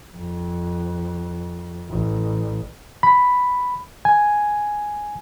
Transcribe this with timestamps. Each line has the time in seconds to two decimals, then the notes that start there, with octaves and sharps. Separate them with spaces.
0.16 F2
1.90 A1
3.03 B5
4.05 G#5